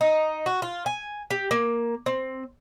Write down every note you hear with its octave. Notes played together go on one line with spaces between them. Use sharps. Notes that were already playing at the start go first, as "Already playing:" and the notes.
D#4
F#4
F4
G#5
G4
A#3
C4